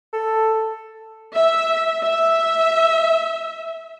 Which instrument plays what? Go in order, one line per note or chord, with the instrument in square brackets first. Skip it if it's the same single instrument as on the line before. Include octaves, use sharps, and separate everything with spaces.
[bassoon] A4
[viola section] E5
E5